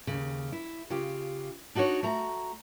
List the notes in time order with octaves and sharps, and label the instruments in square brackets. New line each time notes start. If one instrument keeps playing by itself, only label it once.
[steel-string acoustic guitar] D#2 C#3
E4
C#3 F4 G4
D4 D#4 F#4 C5 C#5
A3 F#4 A#5